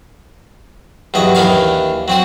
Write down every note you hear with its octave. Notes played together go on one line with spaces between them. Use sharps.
E2 G2 F#3 D#5
D#2 E3 A#3 D4 F5 C#6
F#3 C4 F#4